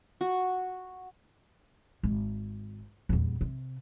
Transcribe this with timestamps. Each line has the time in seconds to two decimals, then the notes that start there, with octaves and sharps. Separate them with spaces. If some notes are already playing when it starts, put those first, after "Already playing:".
0.21 F#4
2.03 G#1
3.09 D#1 E2
3.41 C3